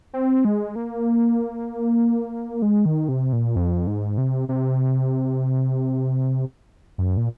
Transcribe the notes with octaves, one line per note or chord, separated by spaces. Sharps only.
C4
G#3
A#3
G#3
D#3
C3
A#2
F2
G#2
C3
C3
F#2
A#2